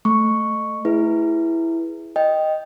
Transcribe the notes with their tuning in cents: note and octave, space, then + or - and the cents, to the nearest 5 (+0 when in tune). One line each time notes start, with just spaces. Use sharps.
A3 +0 C#6 +0
E4 +0 G#4 -5 B4 -10
D#5 +0 G5 +0